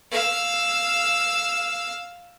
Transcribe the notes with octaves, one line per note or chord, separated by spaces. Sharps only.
F5 E6